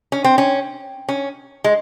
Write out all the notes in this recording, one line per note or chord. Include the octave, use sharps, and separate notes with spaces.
C#4
C4
C#4
C#4
G#3